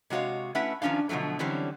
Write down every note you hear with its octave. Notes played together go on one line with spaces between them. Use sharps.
C3 G#3 F#4 C#5 F5
A3 C#4 E4 B4 E5 F#5
D#3 F3 C#4 D4 F5
B2 D3 F3 F#3 A3
D3 E3 F#3 G3 C4 C#4